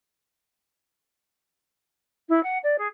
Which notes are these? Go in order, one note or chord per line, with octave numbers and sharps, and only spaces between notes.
E4
F#5
D5
G#4